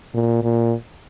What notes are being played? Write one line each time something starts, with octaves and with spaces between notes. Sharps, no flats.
A#2
A#2